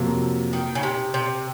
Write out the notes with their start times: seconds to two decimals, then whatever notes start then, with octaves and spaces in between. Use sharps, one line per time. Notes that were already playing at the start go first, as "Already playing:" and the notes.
Already playing: F2 C3 F#3 A#3
0.53 D#3
0.75 C#3
0.83 C3
1.14 C3